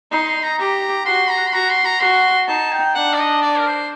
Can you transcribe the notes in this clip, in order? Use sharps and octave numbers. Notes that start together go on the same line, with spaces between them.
D#4 C6
C6
A#5
G4 A#5
F#4 C6
A#5
C6
F#4 A#5
C6
A#5
F#4 C6
D#4 A5
G5
D4 F#5
D5
D#5
D5
A#4
C5